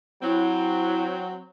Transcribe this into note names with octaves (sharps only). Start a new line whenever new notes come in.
F#3 C4 E4